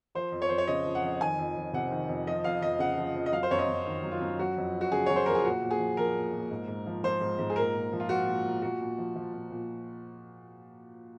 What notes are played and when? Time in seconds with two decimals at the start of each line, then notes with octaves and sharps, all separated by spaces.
0.15 F3 C5
0.32 F2
0.42 C#5
0.49 F2 C5
0.58 C#5
0.67 C#3 D#5
0.86 F3
0.95 F#5
1.03 F2
1.21 D#3 G#5
1.38 F2
1.56 F2
1.73 C3 F#5
1.91 D#3
2.09 F2
2.27 F3 D#5
2.44 F2 F5
2.62 F2 D#5
2.79 C#3 F#5
2.98 F3
3.15 F2
3.26 D#5
3.32 F#3 F5
3.43 C5
3.51 F#2 C#5
3.59 D#5
3.68 F#2
3.86 D#3
4.04 F#3
4.12 F4
4.21 F#2
4.39 F#3 F#4
4.57 F2
4.73 F2
4.81 F#4
4.92 C#3 G#4
5.06 F#3 C#5
5.16 C5
5.26 F2 A#4
5.35 G#4
5.45 A#2 F#4
5.62 A#2
5.71 G#4
5.79 F3
5.97 F3 A#4
6.15 A#2
6.33 A#2
6.51 G#2
6.68 G#2
6.86 F3
7.03 F3 C5
7.21 G#2
7.39 G#2
7.50 G#4
7.56 A#2 A#4
7.74 A#2
7.92 F3
8.00 F4
8.09 F3 F#4
8.27 A#2
8.45 A#2
8.62 A#2 F#4
8.81 A#2
8.98 F3
9.16 F3
9.33 A#2
9.51 A#2